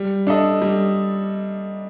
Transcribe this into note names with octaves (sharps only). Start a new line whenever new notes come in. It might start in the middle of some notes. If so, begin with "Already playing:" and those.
Already playing: G3
D4 A4 D#5
G3